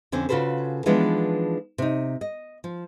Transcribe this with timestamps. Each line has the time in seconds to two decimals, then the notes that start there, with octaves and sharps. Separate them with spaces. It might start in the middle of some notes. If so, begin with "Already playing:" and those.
0.12 F2 D3 C4 C#4
0.29 C#3 F4 F#4 A4 B4 C5
0.86 E3 F3 G#3 B3 D4 D#4
1.78 C3 D#4
2.21 D#5
2.64 F3